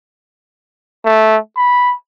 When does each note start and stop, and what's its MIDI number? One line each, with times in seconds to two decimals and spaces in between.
1.05 1.37 57
1.56 1.94 83